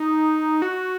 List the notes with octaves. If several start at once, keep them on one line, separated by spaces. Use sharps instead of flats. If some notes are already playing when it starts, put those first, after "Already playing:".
Already playing: D#4
F#4